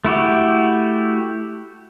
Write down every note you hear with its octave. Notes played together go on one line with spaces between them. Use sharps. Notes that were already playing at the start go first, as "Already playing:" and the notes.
A3 E4 F#4 G4